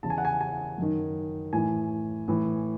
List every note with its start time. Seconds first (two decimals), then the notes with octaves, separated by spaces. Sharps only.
0.03 E2 C#3 E3 A5
0.10 G#5
0.18 F#5
0.25 G#5
0.41 G#5
0.78 F#2 D#3
1.53 A2 E3 G#5
2.28 A2 E3